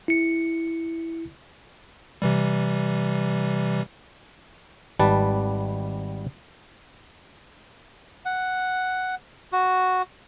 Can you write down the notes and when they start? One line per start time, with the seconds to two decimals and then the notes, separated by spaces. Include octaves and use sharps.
0.08 E4 C#7
2.22 C3 E3 G3
4.99 G#1 G3 B4 A5
8.25 F#5
9.52 F#4